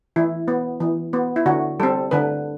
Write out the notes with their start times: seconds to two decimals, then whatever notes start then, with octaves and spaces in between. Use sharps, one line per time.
0.16 E3 E4
0.48 B3
0.80 E3
1.13 B3
1.36 E4
1.46 D3 F#4
1.80 G3 C4 A4
2.11 D3 B4